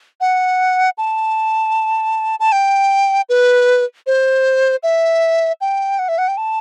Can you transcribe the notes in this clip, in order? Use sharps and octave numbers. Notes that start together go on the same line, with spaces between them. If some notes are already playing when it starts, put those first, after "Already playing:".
F#5
A5
A5
G5
B4
C5
E5
G5
F#5
E5
F#5
G5
A5